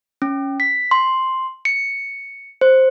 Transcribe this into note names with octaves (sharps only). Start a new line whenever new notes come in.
C#4
B6
C6
C#7
C5